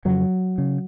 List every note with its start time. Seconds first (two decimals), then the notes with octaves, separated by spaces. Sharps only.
0.05 F2 C#3 F#3
0.58 C#3